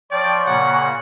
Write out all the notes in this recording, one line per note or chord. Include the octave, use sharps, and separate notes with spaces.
F3 C#5 D5 G5 C6 C#6
A#2 C#3 A#3 F#5